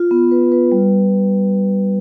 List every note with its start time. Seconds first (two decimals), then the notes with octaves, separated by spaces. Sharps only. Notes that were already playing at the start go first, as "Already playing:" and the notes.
Already playing: F4
0.11 B3
0.31 B4
0.52 B4
0.72 G3